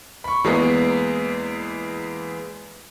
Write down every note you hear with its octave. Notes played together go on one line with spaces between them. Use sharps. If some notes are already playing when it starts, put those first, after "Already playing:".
B5 C#6
E2 G#3 A#3 B3